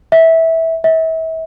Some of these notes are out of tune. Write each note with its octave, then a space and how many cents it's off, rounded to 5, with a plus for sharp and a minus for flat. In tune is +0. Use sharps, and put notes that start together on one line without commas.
E5 -15
E5 -35